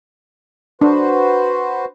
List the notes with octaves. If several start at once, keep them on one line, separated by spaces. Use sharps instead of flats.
D4 F#4 B4 C5